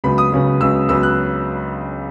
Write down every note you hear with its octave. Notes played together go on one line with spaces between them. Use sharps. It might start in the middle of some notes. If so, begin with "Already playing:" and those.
C#2 C#3 F#3 B3 B5
D#6
C#2 C#3 F#3 B3
C#2 C#3 F#3 B3 E6
C#2 C#3 F#3 B3 E6
F#6